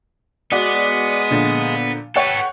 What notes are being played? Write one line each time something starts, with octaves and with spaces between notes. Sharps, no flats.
G#3 B3 F#4 D5 D#6
A#2 D3 F3
A4 B4 C#5 F#5 G5